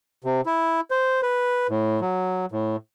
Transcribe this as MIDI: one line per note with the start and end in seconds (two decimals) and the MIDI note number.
0.24 0.41 48
0.46 0.80 64
0.91 1.21 72
1.22 1.67 71
1.70 2.00 45
2.01 2.46 54
2.52 2.76 45